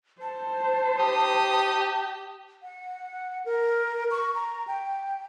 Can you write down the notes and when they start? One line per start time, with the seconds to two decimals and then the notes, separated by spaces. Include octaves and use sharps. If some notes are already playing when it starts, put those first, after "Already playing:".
0.22 C5 A5
1.00 D#4 G4 D#6
2.63 F#5
3.46 A#4
4.11 C#6
4.35 A#5
4.68 G5